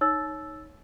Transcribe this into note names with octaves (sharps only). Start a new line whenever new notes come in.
D#4 C#5 E6 A6